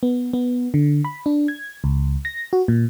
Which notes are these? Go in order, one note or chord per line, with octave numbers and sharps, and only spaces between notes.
B3
B3
D3
B5
D4
G#6
C#2
A#6
F#4
A#2